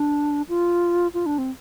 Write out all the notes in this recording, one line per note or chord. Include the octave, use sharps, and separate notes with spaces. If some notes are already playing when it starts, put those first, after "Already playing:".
Already playing: D4
F4
F4
D4
C4